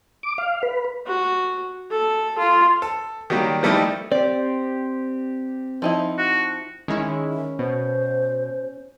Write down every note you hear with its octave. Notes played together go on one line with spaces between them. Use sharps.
D6
F5
B4
F#4
A4
F4
A4
D#3 F#3 G3 A#3
F3 G3 A3 A#3 D#4 E4
C4 G4 D5
F3 D#4 E4
F#4
D#3 G#3 C#4 E4
B2 C5